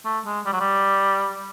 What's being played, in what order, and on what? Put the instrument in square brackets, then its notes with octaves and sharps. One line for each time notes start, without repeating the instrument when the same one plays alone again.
[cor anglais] A3
G#3
G3
F#3
G3